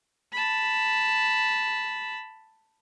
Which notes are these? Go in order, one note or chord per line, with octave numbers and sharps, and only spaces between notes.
A5 B5